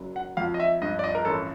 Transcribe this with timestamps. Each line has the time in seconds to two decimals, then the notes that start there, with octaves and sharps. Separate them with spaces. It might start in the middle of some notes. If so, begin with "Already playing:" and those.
Already playing: F#1 F#3
0.16 F#5
0.37 F2 F5
0.54 D#5
0.60 E5
0.82 G2 D#5
0.99 D5
1.04 D#5
1.15 A#4
1.25 A1 A4